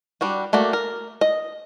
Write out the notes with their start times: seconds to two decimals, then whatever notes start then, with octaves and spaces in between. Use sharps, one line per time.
0.21 G3 D4 F#4
0.53 A3 A#3 F#4 D5
0.73 A#4
1.21 D#5